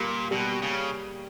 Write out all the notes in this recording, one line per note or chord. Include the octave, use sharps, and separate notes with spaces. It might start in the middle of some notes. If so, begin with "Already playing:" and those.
Already playing: A#2 G3 A#3
B2 G3
C#3